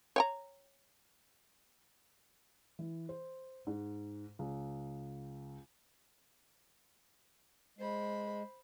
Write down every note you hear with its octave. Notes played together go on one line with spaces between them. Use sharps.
C#5 G5 A#5
E3
C5
G#2
C#2
G#3 C5 B5